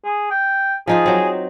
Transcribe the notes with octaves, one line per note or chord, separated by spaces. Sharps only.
G#4
G5
F3 D#4 F4 G#4
F#3 C4